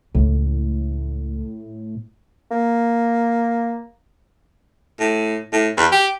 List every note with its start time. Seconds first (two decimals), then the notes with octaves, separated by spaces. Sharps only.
0.14 C#2 A2
2.51 A#3
4.99 A2
5.52 A2
5.78 E2
5.92 G4